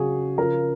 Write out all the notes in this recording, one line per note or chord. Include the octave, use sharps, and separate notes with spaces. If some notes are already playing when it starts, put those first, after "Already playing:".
Already playing: C#3 F#3 F#4 G#4
C#3 F3 A#4